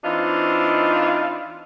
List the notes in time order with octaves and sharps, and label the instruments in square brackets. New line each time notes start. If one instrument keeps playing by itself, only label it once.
[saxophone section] E3 C4 D4 D#4 F4